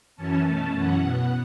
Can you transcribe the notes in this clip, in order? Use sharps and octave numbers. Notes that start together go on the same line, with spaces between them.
F#2 E3 C#4 A5
B2 A3 C#4
F#2 E3 C#4 F#5
B2 B3